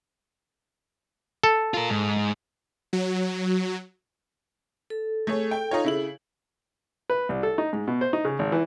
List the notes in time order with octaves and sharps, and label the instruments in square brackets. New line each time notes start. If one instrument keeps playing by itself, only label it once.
[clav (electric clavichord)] A4
[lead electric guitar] F4 A#4
G#2
[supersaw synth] F#3
[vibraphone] A4
[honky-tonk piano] A3 G#4 C#5
G5
D#4 F4 C#5
C#3 E4 F#7
[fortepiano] B4
C2
A4
D#4
G#2
B2
C5
D#4
C#3
G#1
E3